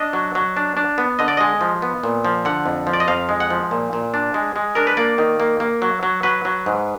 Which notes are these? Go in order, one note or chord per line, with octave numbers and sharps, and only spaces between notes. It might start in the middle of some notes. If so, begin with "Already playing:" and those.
Already playing: D4 D#5
F#3
F#3
D4
D4
B3
D3 D#5
D5
G#3 D#5
F3
B3
A#2
F3
D3 F#5
F2
F3
D5
D#5
F2 F5
G#3
F#5
F3
A#2
A#2
D4
G#3
G#3
D4 A#4
B4
A#3 D5
D#3
A#3
A#3
F#3
F#3
F#3 B4
F#3
G#2